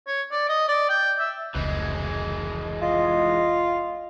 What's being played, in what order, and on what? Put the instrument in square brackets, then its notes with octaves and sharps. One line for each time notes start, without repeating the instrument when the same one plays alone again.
[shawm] C#5
D5
D#5
D5
G5
E5
[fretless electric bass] F1 C#2 [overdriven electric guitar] E3 G#3
[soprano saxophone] F4 [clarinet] D#5